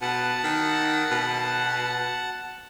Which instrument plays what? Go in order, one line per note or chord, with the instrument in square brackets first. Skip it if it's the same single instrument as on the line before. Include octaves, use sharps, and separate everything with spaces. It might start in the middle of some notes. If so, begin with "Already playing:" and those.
[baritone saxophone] B2 [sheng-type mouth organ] F#5 A5
[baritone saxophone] D#3
B2